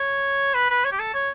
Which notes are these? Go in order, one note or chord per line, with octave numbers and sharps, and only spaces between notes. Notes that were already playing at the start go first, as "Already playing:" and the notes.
Already playing: C#5
B4
B4
C#5
G4
A4
C#5